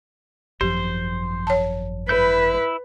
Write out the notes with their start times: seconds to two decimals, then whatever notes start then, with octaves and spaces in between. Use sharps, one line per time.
0.61 G#1 F#2 F3 G4 C5
1.47 C#5 A5
2.09 E4 B4 G6